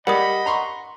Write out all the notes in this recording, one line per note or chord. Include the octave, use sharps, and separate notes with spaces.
G3 A#4 D5 D#5 F#5 B5 D#6
A#5 C6 C#6